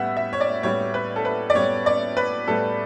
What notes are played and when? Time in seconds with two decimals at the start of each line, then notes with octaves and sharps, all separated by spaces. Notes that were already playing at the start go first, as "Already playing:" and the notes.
Already playing: A2 G3 B3 E5 F#5
0.17 E5
0.33 C#5
0.41 D5
0.63 A2 G3 B3 C#5
0.94 B4
1.16 A4
1.25 B4
1.50 D5
1.55 A2 G3 B3 C#5
1.86 D5
2.17 B4
2.47 A2 G3 B3 A4